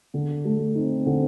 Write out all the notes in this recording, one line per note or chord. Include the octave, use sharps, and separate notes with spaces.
D3
A3
C4 D#4
D3